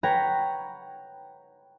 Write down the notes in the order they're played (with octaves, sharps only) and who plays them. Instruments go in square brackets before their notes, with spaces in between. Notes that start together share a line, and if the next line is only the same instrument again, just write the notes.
[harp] B4 C#5 F#5 G5 A#5